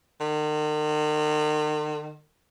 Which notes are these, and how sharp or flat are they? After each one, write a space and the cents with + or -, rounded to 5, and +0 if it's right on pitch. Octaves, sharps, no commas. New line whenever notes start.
D#3 -45